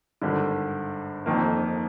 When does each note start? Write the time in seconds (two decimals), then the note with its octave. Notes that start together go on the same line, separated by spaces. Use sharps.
0.22 G#1 G2 D3
1.26 F1 F2 D#3 A#3